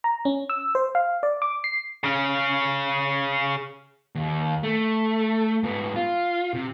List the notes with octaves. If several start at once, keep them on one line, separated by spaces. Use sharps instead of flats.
A#5
C#4
E6
C5
F5
D5
D6
C7
C#3 C#4
D#2
A3
G#2 B3
F4
C3